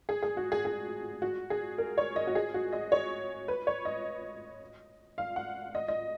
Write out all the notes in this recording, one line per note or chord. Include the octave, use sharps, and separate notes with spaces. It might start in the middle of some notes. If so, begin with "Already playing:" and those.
G#4
G#4
F#4
G#4
G#4
F#4
G#4
A#4
C#5
D#5
F#4
G#4
F#4
D#5
C#5
B4
C#5
D#5
F5
F#5
D#5
D#5